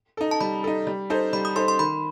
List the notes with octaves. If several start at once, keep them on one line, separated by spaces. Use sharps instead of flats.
D#4 A4
A5
G3 B5
D#4 A4
G3
D#4 A4 C5
G3 B5
D#6
D#4 A4 C5 C6
C6
D#3 B5